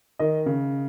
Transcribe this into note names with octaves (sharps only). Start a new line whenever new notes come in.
D#3 D#5
C#3